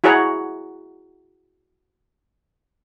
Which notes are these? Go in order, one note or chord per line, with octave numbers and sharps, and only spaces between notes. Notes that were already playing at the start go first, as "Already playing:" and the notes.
E4 F#4 G#4 C#5 F#5 A#5